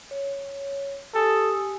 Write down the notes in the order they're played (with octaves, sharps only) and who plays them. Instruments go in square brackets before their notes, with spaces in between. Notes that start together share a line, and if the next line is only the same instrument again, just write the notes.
[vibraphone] C#5
[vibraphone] G4 G#5 D#6 [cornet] A4